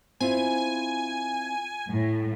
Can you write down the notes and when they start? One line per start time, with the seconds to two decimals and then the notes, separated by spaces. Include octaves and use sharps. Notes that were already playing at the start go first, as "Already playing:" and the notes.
0.20 C4 E4 F4 G#5
1.90 A2